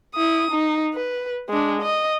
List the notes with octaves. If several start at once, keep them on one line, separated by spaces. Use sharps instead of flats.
E4 D#6
D#4
B4
G#3 D4
D#5